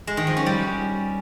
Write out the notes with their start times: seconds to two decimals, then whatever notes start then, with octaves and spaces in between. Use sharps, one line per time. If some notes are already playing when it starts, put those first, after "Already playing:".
0.07 G#3
0.17 D#3
0.27 F3
0.37 C#4
0.46 G3